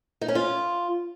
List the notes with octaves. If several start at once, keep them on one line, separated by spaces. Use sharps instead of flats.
D#4
C#4
F4